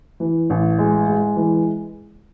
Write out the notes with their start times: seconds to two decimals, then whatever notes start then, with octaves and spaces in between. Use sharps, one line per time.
0.20 E3
0.50 A1
0.79 G#3
1.07 G#3
1.36 E3